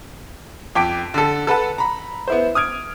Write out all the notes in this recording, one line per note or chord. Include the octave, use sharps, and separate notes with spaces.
F2 G5 D6 B6 D7
D3 A4
A4 B4 F#5 A5
A#5 B5
B3 E4 C5
D#6 F6 G#6 D7